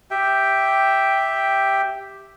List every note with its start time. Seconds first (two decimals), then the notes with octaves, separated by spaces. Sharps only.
0.11 G4 E5 G5